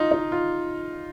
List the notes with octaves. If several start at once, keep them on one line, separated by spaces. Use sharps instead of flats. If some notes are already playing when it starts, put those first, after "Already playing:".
Already playing: D#4 F4
D#4
F4